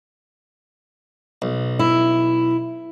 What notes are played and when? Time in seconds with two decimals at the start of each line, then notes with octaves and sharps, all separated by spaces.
1.42 B1
1.79 E4